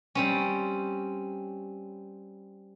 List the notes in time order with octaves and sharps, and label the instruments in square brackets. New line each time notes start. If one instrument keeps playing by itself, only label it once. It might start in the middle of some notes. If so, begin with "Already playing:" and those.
[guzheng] G3 C4 C#4